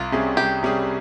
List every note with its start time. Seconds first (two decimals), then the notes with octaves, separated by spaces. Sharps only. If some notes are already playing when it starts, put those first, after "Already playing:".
Already playing: C2 F4
0.12 C3 G3 C#4 G#4
0.37 C2 G4
0.63 C3 G3 C#4 G#4